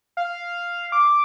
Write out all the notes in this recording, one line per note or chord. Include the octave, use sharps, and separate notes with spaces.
F5
D6